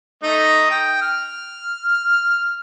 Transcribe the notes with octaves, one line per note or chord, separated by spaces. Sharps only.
A3 D#4 D#5
G5
F6